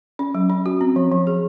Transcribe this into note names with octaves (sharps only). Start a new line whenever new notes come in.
C#4
F#3
C#4
F#4
C4
F3
F3
G#4